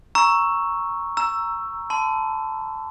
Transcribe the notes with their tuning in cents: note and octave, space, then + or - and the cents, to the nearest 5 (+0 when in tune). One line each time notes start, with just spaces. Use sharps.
A#5 +5 C#6 +0 E6 +0
A#5 +0 E6 +10
A5 +0 C6 -45